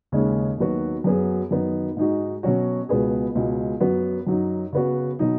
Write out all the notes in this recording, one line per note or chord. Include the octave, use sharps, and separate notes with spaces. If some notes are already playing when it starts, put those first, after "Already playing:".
D#2 C#3 G#3 C#4
D#2 D#3 F#3 B3 F#4
F#2 F#3 B3 G#4
F#2 D#3 B3 D#4
G#2 G#3 D#4 F#4
B2 F#3 C#4 F#4
C#2 B2 B3 G#4
C#2 B2 G#3
F#2 F#3 B3 F#4
F#2 F#3 D#4
C#3 B3 F#4
B2 F#3 D#4